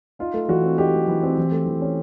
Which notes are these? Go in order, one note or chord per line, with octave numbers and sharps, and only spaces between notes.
D#4 F4
A3
E3 F#4
C4
D#4 G4
A3
E3
C4
E3
A3
E3
C#4